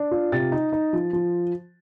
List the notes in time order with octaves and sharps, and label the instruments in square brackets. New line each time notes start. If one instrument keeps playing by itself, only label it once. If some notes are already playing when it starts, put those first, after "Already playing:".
Already playing: [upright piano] D4
F4
C3 A6
D#4
D#4
F3
F3